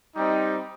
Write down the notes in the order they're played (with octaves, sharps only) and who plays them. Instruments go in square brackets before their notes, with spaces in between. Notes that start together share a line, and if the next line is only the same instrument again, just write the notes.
[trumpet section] G3 C4 D#4